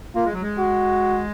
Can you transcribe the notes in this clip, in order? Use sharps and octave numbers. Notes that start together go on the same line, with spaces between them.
A#3 F4
G#3
F#3
G#3
F#4